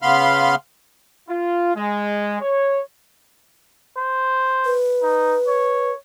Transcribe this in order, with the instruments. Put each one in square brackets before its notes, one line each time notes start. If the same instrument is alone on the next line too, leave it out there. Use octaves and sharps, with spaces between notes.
[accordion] C#3 B3 F5 B5 C6 F6
[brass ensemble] F4
G#3
C#5
[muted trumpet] C5
[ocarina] B4
[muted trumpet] D#4
C#5